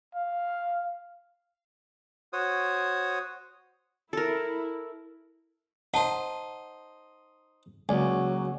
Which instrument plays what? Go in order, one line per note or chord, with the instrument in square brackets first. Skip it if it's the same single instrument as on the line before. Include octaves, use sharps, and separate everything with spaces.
[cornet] F5
[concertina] F#4 C5 C#5 D#6
[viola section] E4 [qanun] A4 A#4
[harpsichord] D#4 C5 [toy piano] F#5 A5
[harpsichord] C#2 [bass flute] F#3 [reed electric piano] A#3 D5 G#5